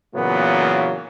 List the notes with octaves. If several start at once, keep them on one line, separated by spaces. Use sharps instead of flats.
A#2 C#3 E3 F#3 A#3 B3